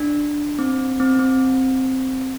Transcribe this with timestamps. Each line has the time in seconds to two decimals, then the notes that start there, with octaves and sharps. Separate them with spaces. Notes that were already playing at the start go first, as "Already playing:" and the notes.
Already playing: D4
0.59 C4
1.00 C4
1.19 C4